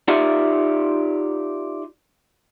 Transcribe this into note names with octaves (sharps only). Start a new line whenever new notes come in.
D#4 F4 G4 D5 E5 F#5